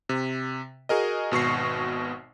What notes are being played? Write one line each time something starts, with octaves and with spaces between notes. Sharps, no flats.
C3
F#4 G#4 A#4 D#5
G#1 B2 C#6 C7